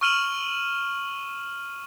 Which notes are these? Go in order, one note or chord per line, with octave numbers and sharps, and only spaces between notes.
C#6 E6 F6 D#7 E7 F#7